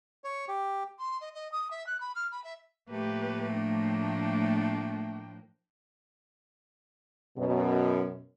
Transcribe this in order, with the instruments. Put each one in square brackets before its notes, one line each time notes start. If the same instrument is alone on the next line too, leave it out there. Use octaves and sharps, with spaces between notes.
[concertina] C#5
G4
[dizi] C6
D#5
D#5
D#6
E5
F#6
B5
F6
B5
E5
[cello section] A2 F3 A#3 [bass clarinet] A3 [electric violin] G4 B4
[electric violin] D4 G5
[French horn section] F#2 B2